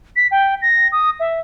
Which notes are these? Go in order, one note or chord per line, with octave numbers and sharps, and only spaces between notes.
B6
G5
A#6
D#6
E5